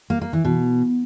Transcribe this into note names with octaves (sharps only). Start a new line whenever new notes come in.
A#3
A#3
E3
B2